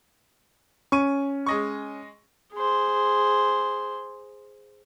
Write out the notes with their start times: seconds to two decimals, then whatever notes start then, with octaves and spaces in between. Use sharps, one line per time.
0.92 C#4 C#6 D#7
1.46 G#3 D#5 C#6
2.54 G#4 C5